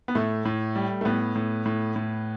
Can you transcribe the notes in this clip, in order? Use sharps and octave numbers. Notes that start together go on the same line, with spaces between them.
B3
A2 A3
A2
G3
A3
A2 B3
A2
A2
A2